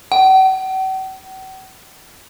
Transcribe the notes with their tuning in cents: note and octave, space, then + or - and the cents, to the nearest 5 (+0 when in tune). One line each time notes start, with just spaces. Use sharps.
F#5 +45